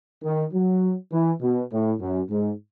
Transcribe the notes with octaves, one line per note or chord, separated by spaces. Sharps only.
D#3
F#3
E3
B2
A2
F#2
G#2